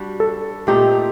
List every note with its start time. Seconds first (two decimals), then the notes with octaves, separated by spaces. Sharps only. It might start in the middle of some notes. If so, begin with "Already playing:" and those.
Already playing: G3 D4 F#4
0.20 A4
0.67 A#2 A3 C4 D#4 G4